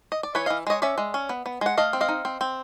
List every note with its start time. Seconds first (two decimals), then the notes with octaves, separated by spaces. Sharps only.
0.12 D#5
0.23 D5
0.35 E3 B4 C#5
0.46 E3 D#5 F5
0.67 G#3 C#5 D#5
0.82 C#4 D5 E5
0.98 G#3
1.14 C#4
1.29 B3
1.46 B3
1.61 G#3 F#5
1.77 A3 D#5 F5
1.93 C4
2.01 D#5 F5
2.09 D#4
2.25 C4
2.41 C4